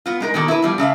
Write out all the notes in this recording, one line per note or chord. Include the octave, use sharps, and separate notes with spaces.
B3 F4
G#3 D#4 A#4
B2 D#3 A#3 A4
E4 B4
F3 G3 B3
C#3 A3 E5 F5